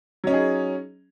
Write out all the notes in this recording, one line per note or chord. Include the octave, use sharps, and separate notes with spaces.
F#3 C#4 D#4 G#4